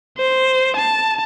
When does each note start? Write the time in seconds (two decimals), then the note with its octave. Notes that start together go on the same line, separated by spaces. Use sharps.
0.17 C5
0.77 A5